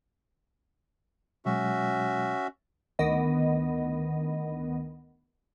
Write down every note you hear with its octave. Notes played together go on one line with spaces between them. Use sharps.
B2 F#3 G#3 C#4 F#4 E5
D2 D#3 B3 D#5